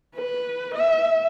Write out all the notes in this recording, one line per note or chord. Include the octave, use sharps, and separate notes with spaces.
B4
E5